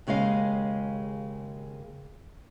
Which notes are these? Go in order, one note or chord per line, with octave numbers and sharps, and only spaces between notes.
D#2 C#3 G#3 D#5 F5